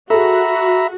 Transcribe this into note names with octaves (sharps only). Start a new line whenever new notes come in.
F#4 G#4 A4 E5 A#5 B5